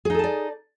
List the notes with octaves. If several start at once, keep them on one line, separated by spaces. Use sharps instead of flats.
D#4 G#4 A4 D5 A5